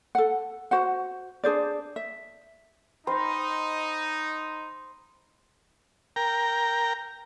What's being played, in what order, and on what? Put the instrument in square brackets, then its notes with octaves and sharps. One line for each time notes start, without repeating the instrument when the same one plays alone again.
[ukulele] A4 F#5
F#4 C5 F#5
D4 G#4 C5 D5
E5
[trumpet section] D#4 [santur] C5 [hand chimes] G5 B5 F6
[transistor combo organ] A#4 G5 A#5